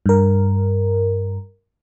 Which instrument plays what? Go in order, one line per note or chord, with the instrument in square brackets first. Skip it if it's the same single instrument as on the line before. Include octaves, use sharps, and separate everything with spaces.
[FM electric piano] G2 A#4